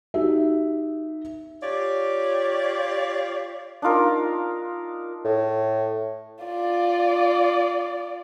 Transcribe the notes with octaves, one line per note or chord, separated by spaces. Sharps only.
D#4 F#4 G4 E5
F4 G4 C#5 D5
D4 D#4 F4 A#4
A2
F4 D5